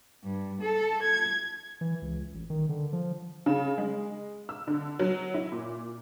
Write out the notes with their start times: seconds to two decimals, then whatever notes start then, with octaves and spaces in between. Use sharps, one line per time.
0.23 G2
0.60 A4
1.02 G#6
1.81 E3
2.02 C#2
2.34 A1
2.50 D#3
2.69 D3
2.93 F3
3.46 C#3
3.78 G#3
4.49 E6
4.67 D3
4.99 F#3
5.34 E4
5.52 A#2